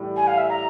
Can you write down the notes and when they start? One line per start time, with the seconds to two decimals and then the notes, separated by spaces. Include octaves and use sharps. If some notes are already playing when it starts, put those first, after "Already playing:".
Already playing: A2 E3 G3
0.16 G#5
0.27 F5
0.37 E5
0.49 A#5